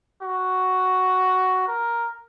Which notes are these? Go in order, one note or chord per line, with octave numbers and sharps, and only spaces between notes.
F#4
A#4